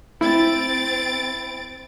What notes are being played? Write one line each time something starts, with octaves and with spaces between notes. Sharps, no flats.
C4 E4 A6 D7